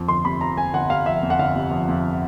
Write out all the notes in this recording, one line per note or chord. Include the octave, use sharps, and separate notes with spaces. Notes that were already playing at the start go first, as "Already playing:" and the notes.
Already playing: F2 F3
G1 C6
C3 B5
F3 A#5
F2 G#5
G1 F#5
C3 F5
F3 E5
F2
F#5
G1 F5
C3
F3
F2